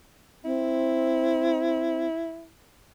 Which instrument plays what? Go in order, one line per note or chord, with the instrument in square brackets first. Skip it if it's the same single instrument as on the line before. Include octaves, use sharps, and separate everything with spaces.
[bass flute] C4 [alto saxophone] E4